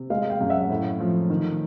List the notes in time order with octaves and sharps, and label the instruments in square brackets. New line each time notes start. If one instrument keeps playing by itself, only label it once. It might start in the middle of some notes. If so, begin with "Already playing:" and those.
Already playing: [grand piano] C3
G#3 D#5 F5
F5 G5
F#2
E5 F#5
A2
F3
D#3